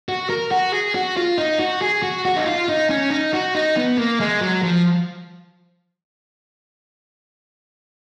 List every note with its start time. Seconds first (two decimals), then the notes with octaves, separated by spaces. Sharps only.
0.09 F#4
0.30 A#4
0.51 F#4
0.73 G#4
0.95 F#4
1.17 F4
1.38 D#4
1.59 F#4
1.81 G#4
2.03 F#4
2.25 F#4
2.37 D#4
2.46 F4
2.69 D#4
2.90 C#4
3.11 D#4
3.33 F#4
3.55 D#4
3.77 B3
3.98 A#3
4.20 G#3
4.41 F#3
4.63 F3